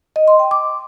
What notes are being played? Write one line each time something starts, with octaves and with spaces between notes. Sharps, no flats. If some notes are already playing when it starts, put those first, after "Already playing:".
D#5
C6
G5
D6